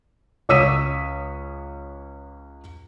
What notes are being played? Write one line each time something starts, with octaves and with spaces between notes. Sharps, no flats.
C#2 C#5 D#6 E6 B6 D#7